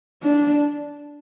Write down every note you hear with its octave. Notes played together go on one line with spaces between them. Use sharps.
D4